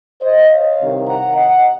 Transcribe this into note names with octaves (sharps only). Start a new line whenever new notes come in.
C5 D#5
C#5 F5
C2 C3 D#3
F#5 A#5
D#5 F#5